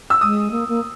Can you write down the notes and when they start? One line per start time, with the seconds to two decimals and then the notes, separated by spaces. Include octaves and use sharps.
0.10 E6
0.21 G#3 D#6
0.51 A#3
0.68 A#3